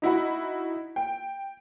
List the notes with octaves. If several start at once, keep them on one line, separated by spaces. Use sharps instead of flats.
D#4 E4 F#4 B5
G5